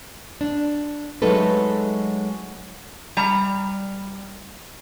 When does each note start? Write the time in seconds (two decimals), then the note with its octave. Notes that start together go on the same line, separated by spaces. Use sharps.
0.41 D4
1.22 F#3 G#3 A3 D#4 A4 B4
3.17 G3 A#5